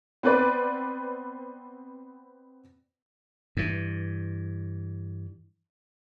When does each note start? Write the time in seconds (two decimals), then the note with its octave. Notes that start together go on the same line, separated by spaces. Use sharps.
0.23 B3 C4 B4 D5
3.57 G2 E3